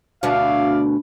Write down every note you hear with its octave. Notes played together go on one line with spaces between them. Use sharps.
D2 B2 F#4 D5 E5 F5